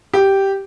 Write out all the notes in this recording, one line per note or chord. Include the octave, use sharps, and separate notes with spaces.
G4